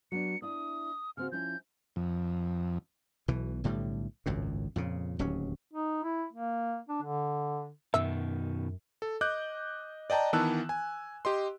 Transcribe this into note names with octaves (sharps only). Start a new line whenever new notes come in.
F#3 B3 D4 C#7
D4 E4 D#6
C#3 C4 F#4 F6
F3 C#4 E4 G6
F2
B1 B2 E3
B1 A2 D3 G3
G#1 C#2 F#2 A2
F2 A#2 C#3
D1 D#2 F#3 C#4
D#4
E4
A#3
D4
D3
F#2 B2 D#3 E5
A4
D#5 D6 F#6 G6
D5 D#5 G5 A5 A#5
D#3 E3 B3 A5 E6 F#6
G#5
G4 D#5 C6